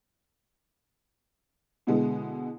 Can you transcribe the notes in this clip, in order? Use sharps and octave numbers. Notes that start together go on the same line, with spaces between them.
B2 D3 E3 G#3 B3